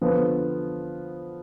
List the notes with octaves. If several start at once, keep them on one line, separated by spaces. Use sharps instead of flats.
D3 F3 B3